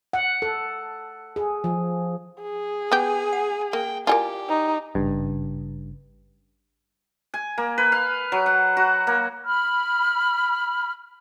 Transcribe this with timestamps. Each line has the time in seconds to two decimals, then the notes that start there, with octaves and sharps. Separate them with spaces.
0.13 F#5
0.42 A4
1.36 G#4
1.64 F3
2.42 G#4
2.92 B3 G4 G#5
3.33 F#5
3.73 A#3 G5
4.07 E4 F4 G4 A4 A#4 D5 G#5
4.49 D#4
4.95 G#1 G2 C#3
7.34 G#5
7.58 A#3
7.78 B4
7.92 F5
8.32 F#3
8.46 F#5
8.77 F#4
9.07 A#3
9.45 B5 F6